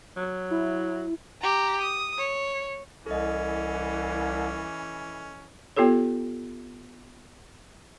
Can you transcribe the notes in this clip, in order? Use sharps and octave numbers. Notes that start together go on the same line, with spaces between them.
F#3
E4
G4 A#5
D#6
C#5
C2 E3 C#4 A4 D#5
B3 F4 G4 A4 C#5